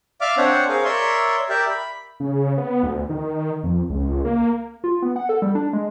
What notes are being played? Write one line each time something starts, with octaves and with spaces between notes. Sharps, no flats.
D5 E5 F5 D6 F6
C4 D4 C5 C#5 F#5
G#4 A#4 C5 C#5 F5
A#4 C#5 D5 E5 C6
G4 A#4 D5 E5
B5
C#3
B3
D2
D#3
F2
C#2
A#3
F4
B3
F#5
A4
G3
D4
G#3